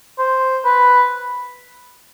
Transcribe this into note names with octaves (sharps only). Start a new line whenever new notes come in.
C5
B4